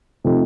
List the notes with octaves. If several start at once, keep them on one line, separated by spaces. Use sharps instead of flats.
C3 F3 A3 D#4